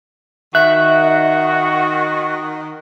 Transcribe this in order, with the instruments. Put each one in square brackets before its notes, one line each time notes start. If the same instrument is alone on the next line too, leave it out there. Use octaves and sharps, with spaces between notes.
[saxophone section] D#3 [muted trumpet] F#4 [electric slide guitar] E5 [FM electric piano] F#6